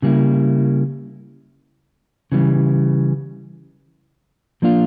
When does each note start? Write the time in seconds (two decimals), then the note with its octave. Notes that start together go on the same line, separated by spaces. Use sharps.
0.02 C#3 G3 A#3 E4
2.32 C#3 E3 G3
4.62 F3 A#3 D4 F4